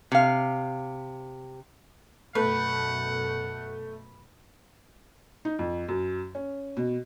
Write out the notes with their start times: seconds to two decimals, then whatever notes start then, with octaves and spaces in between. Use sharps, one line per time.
0.12 C3 F5
2.35 F#2 B2 A3 B4 F#5
5.45 D#4
5.59 F2
5.88 F#2
6.35 C#4
6.77 B2